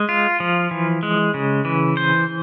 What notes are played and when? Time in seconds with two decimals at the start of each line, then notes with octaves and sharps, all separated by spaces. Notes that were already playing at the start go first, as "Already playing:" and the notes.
Already playing: G#3
0.09 F4
0.40 F3
0.71 E3
1.03 G#3
1.34 C#3
1.65 E3
1.97 C5